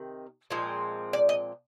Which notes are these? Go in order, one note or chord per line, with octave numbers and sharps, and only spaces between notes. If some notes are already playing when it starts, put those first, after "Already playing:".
Already playing: C3 D#3
A#2 F3 G#3 C4
D5
D#5